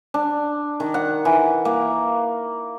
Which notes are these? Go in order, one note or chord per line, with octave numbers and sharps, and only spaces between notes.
D4
D#3
F#5
E3
A#3